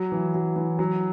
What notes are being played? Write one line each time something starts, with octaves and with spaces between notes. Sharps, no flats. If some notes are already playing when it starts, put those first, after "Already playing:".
Already playing: F#3
E3
F#3
E3
F#3